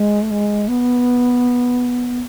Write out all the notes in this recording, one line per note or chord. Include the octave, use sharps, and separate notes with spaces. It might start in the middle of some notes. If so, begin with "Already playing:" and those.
Already playing: G#3
A3
G#3
B3